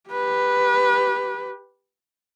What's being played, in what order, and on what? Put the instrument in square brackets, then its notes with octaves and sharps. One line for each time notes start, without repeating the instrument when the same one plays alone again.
[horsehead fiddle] G4 B4